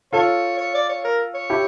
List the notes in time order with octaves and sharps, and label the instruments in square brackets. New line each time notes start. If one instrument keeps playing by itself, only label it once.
[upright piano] F4 A4 [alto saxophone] C#5
[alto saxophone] C#5
D5
C#5
A#4
C#5
[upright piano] E4 G4